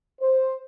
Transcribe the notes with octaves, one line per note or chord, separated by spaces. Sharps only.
C5